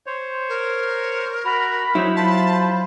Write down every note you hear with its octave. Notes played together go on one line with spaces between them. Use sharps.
C5 C#5
A#4
F#4 A#5 B5
F#3 D#4 E4 C5 C#5
F4 C5 A5